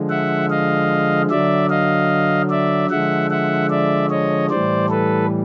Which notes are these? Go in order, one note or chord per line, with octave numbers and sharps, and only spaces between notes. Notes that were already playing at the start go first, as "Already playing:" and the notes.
Already playing: D3 F3 G#3
E5 F#5
D#5 F5
D3 F#3 D5 E5
D#5 F5
D5 E5
D3 F3 G#3 E5 F#5
E5 F#5
D5 E5
C#5 D#5
A2 E3 G3 C5 D5
A4 B4